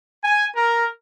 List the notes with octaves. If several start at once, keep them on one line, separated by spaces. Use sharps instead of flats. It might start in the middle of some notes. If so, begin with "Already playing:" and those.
G#5
A#4